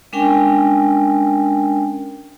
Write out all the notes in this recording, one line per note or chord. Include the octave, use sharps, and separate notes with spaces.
G#3 C#4 D4 A#4 G5 G#5